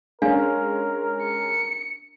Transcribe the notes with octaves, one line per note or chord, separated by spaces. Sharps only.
G#3 C#4 D4 A#4 F5 G#5
C#7